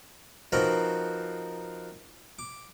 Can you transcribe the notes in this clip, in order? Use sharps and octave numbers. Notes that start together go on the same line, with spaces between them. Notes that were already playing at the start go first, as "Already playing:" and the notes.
F3 C4 D#4 F#4 A#4 B4
D6